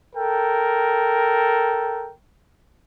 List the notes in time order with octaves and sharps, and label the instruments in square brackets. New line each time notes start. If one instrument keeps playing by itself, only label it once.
[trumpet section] A4 A#4 G5